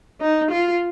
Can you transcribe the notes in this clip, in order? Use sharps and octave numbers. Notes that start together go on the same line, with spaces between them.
D#4
F4